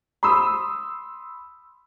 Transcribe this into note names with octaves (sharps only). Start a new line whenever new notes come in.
B5 C6 D#6 E6